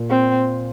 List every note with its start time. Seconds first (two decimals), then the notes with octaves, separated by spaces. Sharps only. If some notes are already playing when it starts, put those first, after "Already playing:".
Already playing: A#2
0.10 C4